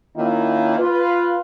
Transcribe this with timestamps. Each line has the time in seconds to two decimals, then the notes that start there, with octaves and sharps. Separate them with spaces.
0.16 D#3 A#3 C#4 E4 F4
0.78 F4 B4